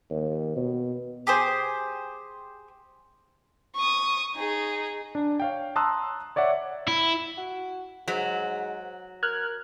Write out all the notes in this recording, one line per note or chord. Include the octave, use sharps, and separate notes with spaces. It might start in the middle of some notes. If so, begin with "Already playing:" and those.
D#2
B2
G4 G#4 C5
C#6 D#6
D#4 G#4
D4
C#5 F5 G5
A5 A#5 C6 D#6 E6 F#6
C#5 D5 E5 F#5
E4
F#4
G#2 F#3
A#4 F6 F#6 G#6